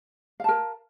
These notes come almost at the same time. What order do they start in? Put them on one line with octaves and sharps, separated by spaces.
F5 A5 A#4